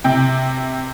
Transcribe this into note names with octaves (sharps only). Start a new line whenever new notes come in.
C3 G5